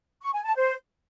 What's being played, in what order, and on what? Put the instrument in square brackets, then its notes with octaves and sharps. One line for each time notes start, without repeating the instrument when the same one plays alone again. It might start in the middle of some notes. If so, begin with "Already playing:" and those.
[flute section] C#6
G#5
A5
C5